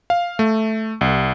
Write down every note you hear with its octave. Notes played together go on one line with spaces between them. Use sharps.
F5
A3
C2